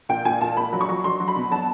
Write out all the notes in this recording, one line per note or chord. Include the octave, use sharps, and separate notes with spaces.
A#2 G5
A#2 G#5
A#2 A5
A#2 B5
F#3
C#6
F#3
F#3 C6
F#3
B5
B2
F#3 A5